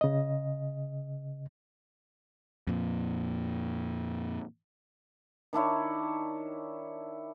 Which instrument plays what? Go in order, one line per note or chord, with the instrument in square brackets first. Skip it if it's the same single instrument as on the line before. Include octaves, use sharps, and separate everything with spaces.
[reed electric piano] C#3 D#5
[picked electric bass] F2 A#2
[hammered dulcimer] D#3 D4 E4 C#5